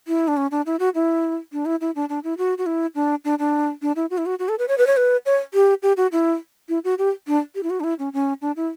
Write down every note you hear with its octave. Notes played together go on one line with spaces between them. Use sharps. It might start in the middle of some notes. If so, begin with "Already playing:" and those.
E4
D4
C#4
D4
E4
F#4
E4
D4
E4
E4
D4
D4
E4
F#4
F#4
E4
D4
D4
D4
D4
E4
F#4
E4
F#4
F#4
A4
B4
C#5
B4
C#5
B4
C#5
G4
G4
F#4
E4
E4
F#4
G4
D4
G4
E4
F#4
D4
E4
C#4
C#4
D4
E4